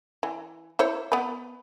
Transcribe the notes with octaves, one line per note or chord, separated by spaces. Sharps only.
E3
E4 C5 C#5
B3 B4